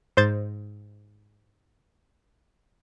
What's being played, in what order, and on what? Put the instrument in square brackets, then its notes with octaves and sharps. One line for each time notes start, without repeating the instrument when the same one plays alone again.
[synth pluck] G#2 C5 G6 A6